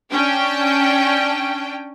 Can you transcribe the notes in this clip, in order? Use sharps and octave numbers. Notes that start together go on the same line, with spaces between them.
C#4 D4 G5